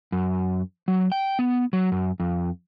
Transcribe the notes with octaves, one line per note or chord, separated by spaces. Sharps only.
F#2
F#3
G5
B3
F#3
F#2
F2